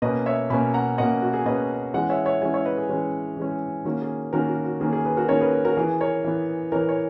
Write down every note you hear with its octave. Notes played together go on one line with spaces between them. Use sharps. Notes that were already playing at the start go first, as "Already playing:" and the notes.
B2 A#3 C#4 B4 D#5
C#5 E5
B2 A#3 C#4 G#5 B5
F#5 A#5
B2 A#3 C#4 D#5 F#5
F#4
G#4
B2 A#3 C#4 B4 D#5
E3 G#3 C#4 D#5 F#5
C#5 E5
C#5 E5
E3 G#3 C#4 E5 G#5
C#5 E5
B4 D#5
G#4
E3 G#3 C#4
E3 G#3 C#4
D#3 A#3 C#4 F#4
G#4
D#3 A#3 C#4 F#4 A#4
F#4
F#4
D#3 A#3 C#4 G#4
G#4
G#4 B4
F#4 A#4
D#3 A#3 C#4 A#4 C#5
G#4 B4
G#4
F#4 A#4
E3 B3 G#4 B4
A#4 C#5
E3 B3
E3 B3 A#4 C#5
C#5